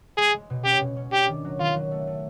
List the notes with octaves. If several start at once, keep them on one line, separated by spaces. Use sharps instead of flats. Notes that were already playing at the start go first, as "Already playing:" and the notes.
G#3 G#4
G#3
B2
C#4 G4
B2
C#4
D4 G4
D#3
F#3
D#3 F4
F#3
A3
A3